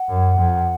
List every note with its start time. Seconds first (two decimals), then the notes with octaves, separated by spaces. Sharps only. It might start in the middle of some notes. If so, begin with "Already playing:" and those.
Already playing: F#5
0.09 F#2
0.38 F2